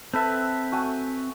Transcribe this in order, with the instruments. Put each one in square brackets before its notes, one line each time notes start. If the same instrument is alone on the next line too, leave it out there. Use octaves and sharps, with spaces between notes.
[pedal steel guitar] C4 E5 [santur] A4 B4
[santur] A3 F#4 G#5